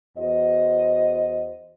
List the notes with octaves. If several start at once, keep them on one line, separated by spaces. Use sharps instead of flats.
E2 F#4 C5 D#5